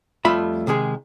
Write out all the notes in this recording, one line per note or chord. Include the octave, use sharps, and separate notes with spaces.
F2 G3 A3 F4 E5 B5
C3 D#3 G#3 G#4